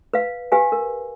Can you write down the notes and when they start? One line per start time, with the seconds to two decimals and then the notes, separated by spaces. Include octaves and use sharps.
0.14 B4 F5
0.52 G4 B4 F5 G#5
0.72 A#4